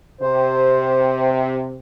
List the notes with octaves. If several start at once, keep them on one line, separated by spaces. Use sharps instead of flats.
C3 C5